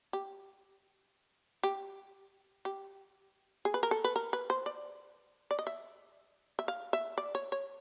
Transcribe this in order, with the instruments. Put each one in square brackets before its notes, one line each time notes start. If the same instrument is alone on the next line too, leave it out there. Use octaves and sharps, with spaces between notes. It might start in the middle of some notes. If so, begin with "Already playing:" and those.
[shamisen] G4
G4
G4
G#4
B4
A#4
A4
B4
A#4
B4
C5
D5
D5
D#5
E5
E5
F5
E5
D5
C#5
C#5